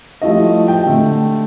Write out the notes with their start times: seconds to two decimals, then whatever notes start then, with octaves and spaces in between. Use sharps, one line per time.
0.22 F3 G3 A3 E4 F#4 D#5
0.68 G5
0.86 D3 A3